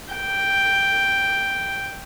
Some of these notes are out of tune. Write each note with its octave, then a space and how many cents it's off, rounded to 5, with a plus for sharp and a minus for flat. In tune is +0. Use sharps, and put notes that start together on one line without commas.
G5 +0